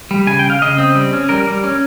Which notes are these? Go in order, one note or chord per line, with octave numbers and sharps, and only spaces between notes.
G3
C#3 G#5
G5
C#3
F5
C#3 D#5
C4
G3
C#4
G3 A#4
G3
C#4